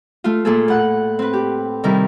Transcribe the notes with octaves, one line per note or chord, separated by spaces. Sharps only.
A3 F4
A#2 A3 A#3 G#4 A4
A2 F#5 F#6
C4 B4
G4
C3 D#3 G3 E4 A#4